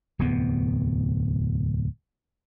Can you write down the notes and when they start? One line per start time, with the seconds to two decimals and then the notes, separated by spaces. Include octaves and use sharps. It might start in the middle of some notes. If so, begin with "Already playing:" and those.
0.19 D1 E2 C3 B3